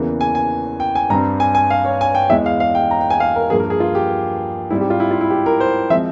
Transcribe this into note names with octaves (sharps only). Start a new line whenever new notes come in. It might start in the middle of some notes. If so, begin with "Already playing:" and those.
Already playing: E2 C#3 E3 A#3
G#5
G#5
G5
G#5
G2 G3 C4 A#5
G#5
G#5
F5
C#5
G#5
G5
E2 E3 G#3 E5
F5
F5
G5
A#5
G5
G#5
F5
A#4
G2 F3 A#3 G#4
A#4
G#4
F4
G4
G#2 G3 C4 E4
G4
F4
E4
F4
E4
G4
A#4
C5
F3 G#3 C4 E5